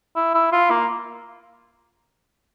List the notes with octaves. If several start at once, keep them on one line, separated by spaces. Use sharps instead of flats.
E4
E4
F4
A#3